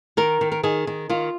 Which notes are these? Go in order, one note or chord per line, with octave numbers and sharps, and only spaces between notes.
D#3 A#4
D#3
A#4
D#3 G#4
D#3
D#3 F4